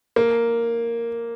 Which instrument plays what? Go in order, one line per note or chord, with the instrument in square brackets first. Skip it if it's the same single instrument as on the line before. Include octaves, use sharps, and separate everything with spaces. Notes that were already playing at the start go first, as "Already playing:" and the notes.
[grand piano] A#3